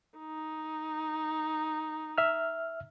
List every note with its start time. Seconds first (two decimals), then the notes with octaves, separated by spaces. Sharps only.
0.18 D#4
2.18 E5 F6